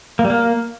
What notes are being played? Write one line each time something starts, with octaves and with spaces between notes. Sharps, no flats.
A#3
G3
A#3